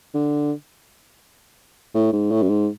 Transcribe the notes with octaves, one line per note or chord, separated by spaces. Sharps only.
D3
A2
G#2
A2
F#2
G#2